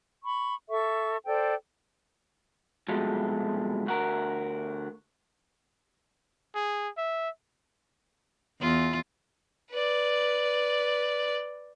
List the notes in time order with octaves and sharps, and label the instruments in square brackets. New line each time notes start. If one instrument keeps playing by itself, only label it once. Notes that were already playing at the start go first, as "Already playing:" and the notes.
[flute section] B5 C#6
A4 E5 C#6
A4 C5 D5 G5
[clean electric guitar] C2 B2 F3 F#3 G#3 A3
D2 F#4 A#4
[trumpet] G#4
E5
[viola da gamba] E2 [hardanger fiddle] F4
[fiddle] B4 D5